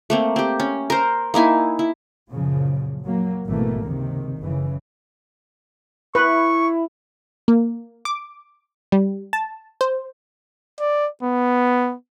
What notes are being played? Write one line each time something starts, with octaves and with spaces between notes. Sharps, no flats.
A3 A#3 C4
C4 G4
C#4
A#4 C5
A#3 D#4 E4 G#5
E4
F#2 A#2 C#3 F3
F#3 A#3
G#1 B2 E3 A3 A#3
C#2 G2 C3 D#3
F#1 C#3 E3
E4 B4 C#6
A#3
D6
G3
A5
C5
D5
B3